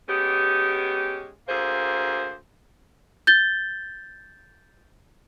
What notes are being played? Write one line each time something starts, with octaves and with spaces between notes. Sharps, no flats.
G#3 B3 C#4 G4
D2 A#3 G#4 C5
G6 A6 G7